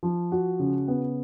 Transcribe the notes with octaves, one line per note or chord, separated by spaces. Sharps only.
F3
F#4
C#3
B3